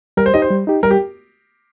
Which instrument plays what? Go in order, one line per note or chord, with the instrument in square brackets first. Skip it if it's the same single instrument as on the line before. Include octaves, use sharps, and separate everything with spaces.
[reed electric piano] G3 [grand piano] A#4
[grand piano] C5
[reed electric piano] D#4 G4 [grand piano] D#5
[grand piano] C5
[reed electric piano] G3
D#4 G4
[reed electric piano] G3 [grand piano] A#4
[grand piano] G4